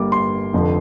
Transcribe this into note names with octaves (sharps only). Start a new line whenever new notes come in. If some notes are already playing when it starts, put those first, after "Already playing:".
Already playing: G1 G2 G3 A#3 D6
C6
F1 F2 D3 F3